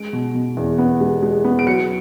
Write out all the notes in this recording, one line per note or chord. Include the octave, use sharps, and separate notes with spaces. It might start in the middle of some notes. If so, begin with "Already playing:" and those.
Already playing: G#3 D7
B2
B2
E2
B3
G#3
G#3
B3
D7
F#3 C#7